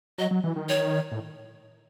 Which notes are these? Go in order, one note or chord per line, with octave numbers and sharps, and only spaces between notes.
F#3 D#5
F#3
E3
D#3
C#5
A2